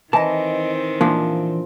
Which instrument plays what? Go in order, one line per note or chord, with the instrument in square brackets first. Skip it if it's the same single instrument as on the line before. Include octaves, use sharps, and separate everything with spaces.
[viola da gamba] D#3 C4 [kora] E3 [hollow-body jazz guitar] D#5 A5
[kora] A#2 F3 [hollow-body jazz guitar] E3 A#3 D4